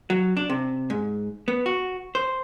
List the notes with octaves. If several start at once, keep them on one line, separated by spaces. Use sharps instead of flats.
F#3
D4
C3
G#2
B3
F#4
C5